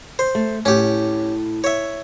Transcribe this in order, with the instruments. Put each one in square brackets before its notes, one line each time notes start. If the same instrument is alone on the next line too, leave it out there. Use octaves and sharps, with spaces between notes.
[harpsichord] C5
[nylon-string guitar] A3
[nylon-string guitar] A2 [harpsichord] C#4 G4
[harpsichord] C#5 E5